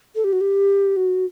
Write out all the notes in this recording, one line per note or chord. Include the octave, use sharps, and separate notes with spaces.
A4
G4
F#4
G4
F#4